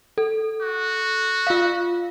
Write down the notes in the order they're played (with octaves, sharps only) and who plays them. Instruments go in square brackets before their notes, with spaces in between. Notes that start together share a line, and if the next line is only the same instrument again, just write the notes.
[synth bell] A4
[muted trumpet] F#4
[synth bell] F4 F5